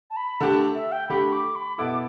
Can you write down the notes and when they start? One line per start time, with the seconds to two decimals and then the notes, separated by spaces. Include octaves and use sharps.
0.10 A5
0.17 B5
0.40 D3 A3 G4 A5
0.75 E5
0.92 G5
1.09 D3 A3 G4 B5
1.32 D6
1.56 B5
1.78 B2 B3 E4 A4 D6